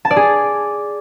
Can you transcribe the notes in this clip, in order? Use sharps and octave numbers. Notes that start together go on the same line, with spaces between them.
A5
D5
G#4